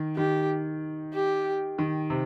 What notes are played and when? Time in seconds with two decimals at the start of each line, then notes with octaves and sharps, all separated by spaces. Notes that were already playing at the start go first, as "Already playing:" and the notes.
Already playing: D#3
0.17 D#3 G4
1.14 G4
1.78 D#3
2.10 C3